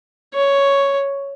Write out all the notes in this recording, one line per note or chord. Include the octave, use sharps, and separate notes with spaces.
C#5